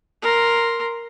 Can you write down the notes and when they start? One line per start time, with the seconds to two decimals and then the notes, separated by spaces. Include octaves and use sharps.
0.22 A#4 C6